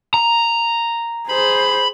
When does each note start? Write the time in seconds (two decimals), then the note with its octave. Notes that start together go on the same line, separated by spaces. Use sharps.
0.14 A#5
1.29 G#4 C5 B5